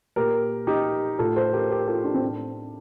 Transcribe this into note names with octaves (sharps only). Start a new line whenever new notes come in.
A#2 G4 A#4
D#4 G4
A2 F4 A4
A4 C5
G4 A#4
G4 A#4
F4 A4
D4 F4
C4
A2 D4